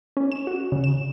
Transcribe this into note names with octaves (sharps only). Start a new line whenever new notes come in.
C#4
E7
F#4
C#3
E7